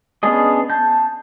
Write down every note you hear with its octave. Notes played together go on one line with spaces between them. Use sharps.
B3 C#4 D4 G#4 D#5
A5 G6